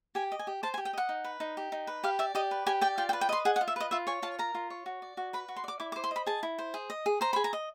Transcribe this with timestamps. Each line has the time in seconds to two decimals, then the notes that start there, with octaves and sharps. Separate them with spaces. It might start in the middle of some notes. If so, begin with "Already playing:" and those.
0.15 G4 G#5
0.32 D#5
0.39 G#5
0.47 G4
0.63 C5 A5
0.74 G#5
0.78 G4
0.85 G5
0.93 D#5 F#5
1.09 D#4
1.24 B4
1.40 D#4
1.57 G4
1.72 D#4
1.87 B4
2.04 G4 F5
2.19 D5 E5
2.35 G4 D#5
2.51 B4
2.66 G4 G#5
2.81 D5 G5
2.98 F4 G5
3.09 G5
3.13 B4
3.21 G5
3.29 D#5 C6
3.45 G#4 F#5
3.56 F#5
3.61 F4
3.68 E5
3.76 B4 D#5
3.91 F4 E5
4.07 C#5 G#5
4.22 F4 A5
4.39 A#4 A#5
4.55 F4
4.70 C#5
4.86 F#4
5.02 D5
5.17 F#4
5.33 B4 B5
5.48 F#4
5.56 C6
5.64 D5 D6
5.80 E4 D6
5.92 D6
5.96 C5
6.04 C6
6.11 D#5 B5
6.26 G#4 A5
6.43 E4
6.59 C5
6.74 G#4
6.90 D#5
7.06 G#4
7.21 C5 A#5
7.33 G#4 B5
7.44 A#5
7.53 D#5